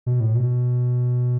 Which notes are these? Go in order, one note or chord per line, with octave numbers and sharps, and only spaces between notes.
B2
A2
B2